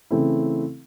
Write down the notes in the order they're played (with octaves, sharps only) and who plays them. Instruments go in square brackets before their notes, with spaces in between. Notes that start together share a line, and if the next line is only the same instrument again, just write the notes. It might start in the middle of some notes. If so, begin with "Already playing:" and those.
[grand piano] C#3 E3 A3 C4 E4